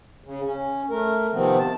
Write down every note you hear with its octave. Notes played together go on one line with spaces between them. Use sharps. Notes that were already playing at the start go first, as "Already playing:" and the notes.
C#3
C#4
A3 A#4
C3 D#3 F3 B3 C4
A5